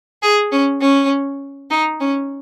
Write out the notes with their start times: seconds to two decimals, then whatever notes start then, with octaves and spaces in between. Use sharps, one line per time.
0.23 G#4
0.52 C#4
0.81 C#4
1.70 D#4
2.00 C#4